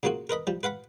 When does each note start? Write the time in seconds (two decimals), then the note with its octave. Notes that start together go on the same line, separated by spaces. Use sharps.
0.03 C#3 F#3 A#3 F4 F#4
0.29 A#4 B4 D#5 B5
0.47 F3 G3
0.63 B4 F5 F#5 B5